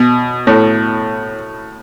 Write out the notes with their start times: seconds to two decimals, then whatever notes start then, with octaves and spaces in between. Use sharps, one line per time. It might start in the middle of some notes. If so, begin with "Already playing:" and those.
Already playing: B2
0.47 A2